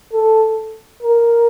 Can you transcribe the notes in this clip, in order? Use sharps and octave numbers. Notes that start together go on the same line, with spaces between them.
A4
A#4